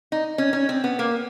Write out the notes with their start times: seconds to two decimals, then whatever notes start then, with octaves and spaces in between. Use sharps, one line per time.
0.12 D#4
0.38 C#4
0.53 C#4
0.69 C4
0.84 B3
0.99 A#3